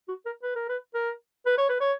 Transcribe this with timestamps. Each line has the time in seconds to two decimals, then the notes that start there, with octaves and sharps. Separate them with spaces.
0.08 F#4
0.26 A#4
0.43 B4
0.56 A#4
0.69 B4
0.95 A#4
1.46 B4
1.58 C#5
1.69 B4
1.81 C#5